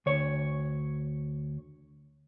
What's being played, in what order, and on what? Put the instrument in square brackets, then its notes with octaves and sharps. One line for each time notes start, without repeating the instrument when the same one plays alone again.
[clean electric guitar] D2 C#5